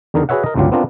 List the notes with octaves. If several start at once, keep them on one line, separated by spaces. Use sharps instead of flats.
E2 D3 D#3 D#4 A#4
F#4 G#4 B4 C#5 E5 F#5
A#4 D#5
G1 C#2 G2 F#3 F4 G4
B3 C4 D4 F4 A#4